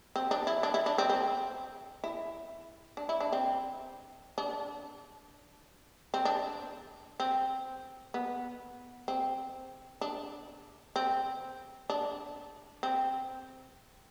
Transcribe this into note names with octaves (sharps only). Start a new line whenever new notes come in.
C4
D4
E4
D4
E4
D4
C4
C4
E4
D4
E4
D4
C4
D4
C4
D4
C4
B3
C4
D4
C4
D4
C4